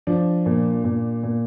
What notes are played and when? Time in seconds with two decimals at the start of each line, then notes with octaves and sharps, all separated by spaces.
0.07 F3 D4
0.46 A#2
0.84 A#2
1.23 A#2